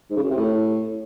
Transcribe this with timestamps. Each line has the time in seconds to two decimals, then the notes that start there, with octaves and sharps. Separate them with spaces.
0.10 G#2
0.17 C#3
0.23 F#2
0.30 C3
0.37 A2